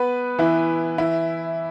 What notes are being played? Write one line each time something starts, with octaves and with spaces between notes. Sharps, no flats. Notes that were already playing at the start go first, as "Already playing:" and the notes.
Already playing: B3 B4
E3 E4
E3 E4